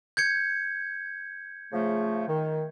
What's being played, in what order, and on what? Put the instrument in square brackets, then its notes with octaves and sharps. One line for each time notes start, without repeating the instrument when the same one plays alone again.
[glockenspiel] G6 G#6 C#7
[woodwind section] C#3 F3 A3
D#3